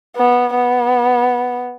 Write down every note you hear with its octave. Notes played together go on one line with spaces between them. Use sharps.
B3
B3